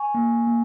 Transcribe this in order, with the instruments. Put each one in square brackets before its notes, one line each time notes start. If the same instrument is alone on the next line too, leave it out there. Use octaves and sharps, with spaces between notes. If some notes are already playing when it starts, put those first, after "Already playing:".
Already playing: [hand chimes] G#5 C#6
A#3
A#3